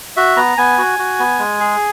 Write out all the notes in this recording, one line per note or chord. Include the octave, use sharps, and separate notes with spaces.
F#4 E5
B3 A#5
B3 G#5
F#4
F#4
B3
G#3
G#4